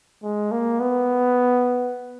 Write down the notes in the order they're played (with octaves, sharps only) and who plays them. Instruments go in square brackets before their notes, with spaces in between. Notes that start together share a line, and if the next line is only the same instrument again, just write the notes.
[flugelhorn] G#3
A#3
B3